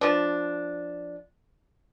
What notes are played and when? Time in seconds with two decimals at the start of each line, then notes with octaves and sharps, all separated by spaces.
0.01 F3 D4